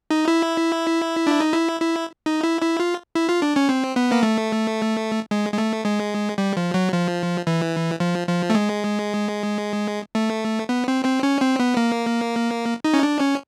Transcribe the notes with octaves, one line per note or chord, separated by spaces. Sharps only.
D#4
E4
D4
D#4
E4
E4
D#4
E4
E4
F4
E4
F4
D4
C#4
C4
B3
A#3
A3
G#3
G#3
A3
G#3
G3
F3
F#3
F3
E3
F3
F3
A3
G#3
A3
B3
C4
C4
C#4
C4
B3
A#3
D#4
C#4
D4
C#4